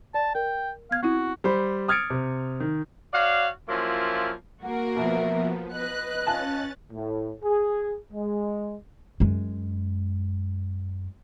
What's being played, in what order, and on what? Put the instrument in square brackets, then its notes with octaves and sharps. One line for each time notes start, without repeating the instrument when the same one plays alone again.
[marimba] D5 [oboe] A5
[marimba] A#4 [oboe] G5
[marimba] B3 G#6 [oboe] F5
[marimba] C4 E4 [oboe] F#4
[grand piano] G3 C5 B5
D#6 F6 G#6 A6 C#7 D7
C3
D#3
[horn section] F#4 C#5 D5 F5
F3 F#3 A#3 C#4 E4 F4
[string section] A#3 F#4 A#4 [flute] F#5
[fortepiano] B2 [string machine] F3 B3 [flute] E5
[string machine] B4 [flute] D#5 [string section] F#6
[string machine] C#4 A6 [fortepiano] F4 G#5 A5
[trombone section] A2
G#4
G#3
[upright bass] F#2 G#3